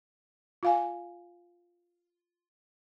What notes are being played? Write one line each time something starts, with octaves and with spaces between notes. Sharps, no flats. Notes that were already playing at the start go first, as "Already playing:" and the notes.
F4 F5 G#5